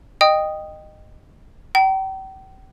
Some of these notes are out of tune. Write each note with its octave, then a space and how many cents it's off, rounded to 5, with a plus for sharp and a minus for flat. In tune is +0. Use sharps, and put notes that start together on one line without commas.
D#5 -15 G5 +0 D#6 +0
G5 -40 A#5 +15